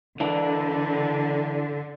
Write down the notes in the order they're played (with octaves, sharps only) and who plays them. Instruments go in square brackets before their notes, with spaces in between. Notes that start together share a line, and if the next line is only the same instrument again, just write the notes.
[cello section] D3 [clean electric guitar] E3 D4